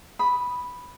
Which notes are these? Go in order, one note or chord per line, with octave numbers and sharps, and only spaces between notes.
B5 D#6